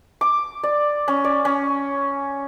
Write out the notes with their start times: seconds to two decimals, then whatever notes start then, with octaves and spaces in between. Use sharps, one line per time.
0.21 D6
0.63 D5
1.08 C#4
1.24 D5
1.45 C#4